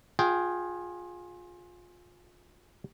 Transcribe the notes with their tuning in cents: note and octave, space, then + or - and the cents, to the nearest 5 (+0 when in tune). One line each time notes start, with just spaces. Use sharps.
F4 +25 G#4 +0 G5 -15